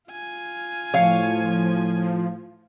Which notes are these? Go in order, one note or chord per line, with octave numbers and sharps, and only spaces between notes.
F4 G#5
A2 F3 C#5 F5